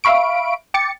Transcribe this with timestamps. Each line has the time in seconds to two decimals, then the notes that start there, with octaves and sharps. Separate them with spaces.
0.04 E5 F5 B5 C#6 D7
0.74 G5 D6 A6 C#7